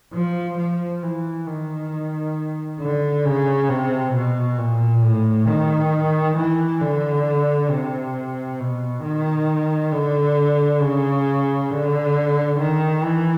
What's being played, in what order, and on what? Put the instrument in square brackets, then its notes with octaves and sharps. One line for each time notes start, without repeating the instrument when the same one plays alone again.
[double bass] F3
F3
E3
D#3
D3
C#3
C3
B2
A#2
A2
D#3
E3
D3
C3
B2
D#3
D3
C#3
D3
D#3
E3